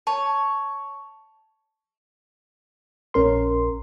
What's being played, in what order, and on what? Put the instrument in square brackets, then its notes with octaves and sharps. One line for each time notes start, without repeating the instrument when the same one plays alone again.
[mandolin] C#5 [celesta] A5
[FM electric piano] A#1 C#4 A#4 C6